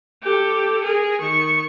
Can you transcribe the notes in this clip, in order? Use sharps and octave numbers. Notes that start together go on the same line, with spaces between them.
G4 A4
G#4 A#4
D#3 C#6